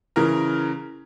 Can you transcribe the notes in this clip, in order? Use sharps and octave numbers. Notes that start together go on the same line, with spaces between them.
C#3 E3 A#4